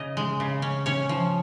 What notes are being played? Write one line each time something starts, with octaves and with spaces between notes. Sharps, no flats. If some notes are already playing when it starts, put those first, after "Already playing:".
Already playing: C#3 D#5
G#3
C#3
C#4
C#4 C#5
F3